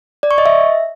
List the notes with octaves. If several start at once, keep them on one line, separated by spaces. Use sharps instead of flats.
D5
C#6
D#5
E5